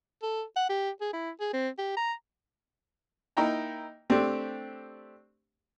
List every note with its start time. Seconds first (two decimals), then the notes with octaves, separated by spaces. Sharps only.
0.23 A4
0.56 F#5
0.70 G4
1.01 G#4
1.13 E4
1.40 G#4
1.53 C4
1.78 G4
1.97 A#5
3.37 A#3 D#4 E4 G5 A#5
4.10 A3 C4 D4 G4